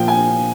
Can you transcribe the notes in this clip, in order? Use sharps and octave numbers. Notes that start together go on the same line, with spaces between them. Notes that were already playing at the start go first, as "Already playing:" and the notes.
Already playing: A#2 F3 G5
G#5